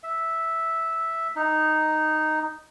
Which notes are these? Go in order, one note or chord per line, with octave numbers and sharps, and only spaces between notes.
E5
D#4